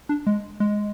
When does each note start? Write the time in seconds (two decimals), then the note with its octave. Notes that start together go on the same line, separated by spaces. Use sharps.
0.09 D4
0.27 G#3
0.60 G#3